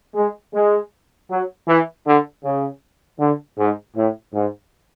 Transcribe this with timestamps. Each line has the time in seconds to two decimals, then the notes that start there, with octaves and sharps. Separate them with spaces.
0.15 G#3
0.54 G#3
1.30 F#3
1.67 E3
2.06 D3
2.44 C#3
3.19 D3
3.58 G#2
3.96 A2
4.33 G#2